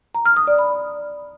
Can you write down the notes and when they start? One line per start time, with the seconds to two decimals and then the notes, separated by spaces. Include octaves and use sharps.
0.15 A#5
0.26 F6
0.36 D#6
0.47 D5
0.58 B5